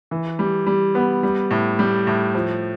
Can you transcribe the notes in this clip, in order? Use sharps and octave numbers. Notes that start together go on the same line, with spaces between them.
E3
G3
G3
B3
G3
A2
G3
A2
F3